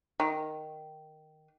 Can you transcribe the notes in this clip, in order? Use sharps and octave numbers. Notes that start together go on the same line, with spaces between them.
D#3